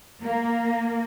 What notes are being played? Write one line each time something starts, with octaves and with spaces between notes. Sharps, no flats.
A#3